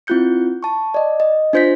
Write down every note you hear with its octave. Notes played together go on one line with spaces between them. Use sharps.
C4 E4 F4 F#6 G6 C#7
A5 C#6
D5 D#5
D#5
D4 F4 C5 G6 A#6 B6